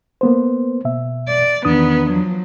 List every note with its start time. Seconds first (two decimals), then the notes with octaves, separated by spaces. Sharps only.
0.21 A#3 B3 C5
0.85 B2 E5
1.28 D5
1.65 E2 D#3 B3 D4 D#6
2.10 F3 F#3